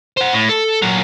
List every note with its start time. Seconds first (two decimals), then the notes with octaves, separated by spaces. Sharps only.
0.17 C5 F#5
0.33 A2
0.49 A4
0.82 A#2 F#3